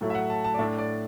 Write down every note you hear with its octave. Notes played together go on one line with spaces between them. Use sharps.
A2 F#3 A3 E4
E5
F#5
A5
A5
D5
A2 A3 D4 E5
D5